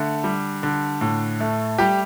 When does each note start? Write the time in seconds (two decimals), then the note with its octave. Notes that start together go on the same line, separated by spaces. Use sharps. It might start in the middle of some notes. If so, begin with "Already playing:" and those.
Already playing: D3 A3
0.24 G3
0.63 D3
1.01 A2
1.40 A3
1.78 G3 G4